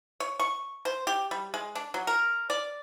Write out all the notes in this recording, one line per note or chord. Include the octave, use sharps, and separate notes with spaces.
C#5
C#6
C5
G4
G3
G#3
D4
F#3
A#4
D5